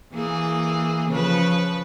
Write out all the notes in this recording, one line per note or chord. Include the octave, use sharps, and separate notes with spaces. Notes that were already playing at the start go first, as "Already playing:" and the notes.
E3 A#3 G#4
C#3 F3 B4